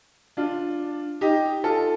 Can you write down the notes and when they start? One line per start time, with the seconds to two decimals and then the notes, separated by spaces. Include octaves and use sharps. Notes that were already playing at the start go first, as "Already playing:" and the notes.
0.37 D4 F4
1.21 D#4 G4
1.64 F4 A4